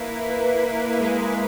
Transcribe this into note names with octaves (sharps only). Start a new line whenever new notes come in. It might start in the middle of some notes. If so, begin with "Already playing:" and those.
Already playing: A#3 E4 B4
G#3